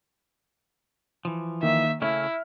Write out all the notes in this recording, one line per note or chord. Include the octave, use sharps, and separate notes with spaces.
E3 F3
D#3 A#3 D#4 E5
C#3 A3 C#4 E4 E5 F6